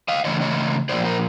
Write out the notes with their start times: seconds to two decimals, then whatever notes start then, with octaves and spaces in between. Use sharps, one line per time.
0.08 D#5 F5
0.25 C#3 E3 A3 D4 C#5 D#5
0.41 C#5 D#5
0.89 A#2 F3 A#3 C5 D5
1.05 A#4 C5